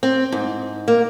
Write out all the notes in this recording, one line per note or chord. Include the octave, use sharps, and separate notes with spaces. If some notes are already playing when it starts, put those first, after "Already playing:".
C4
G#2
A#3